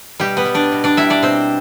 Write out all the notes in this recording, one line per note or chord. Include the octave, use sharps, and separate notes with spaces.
B2 G3 G4
B3 B4
G3
D4 D5
B2
D4 D5
G3 E4 E5
D4 D5
B2 C4 C5